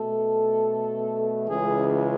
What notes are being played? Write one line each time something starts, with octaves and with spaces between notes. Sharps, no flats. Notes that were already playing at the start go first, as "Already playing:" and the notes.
Already playing: B2 A3 A4
C#2 C#3 E3 G#3 G#4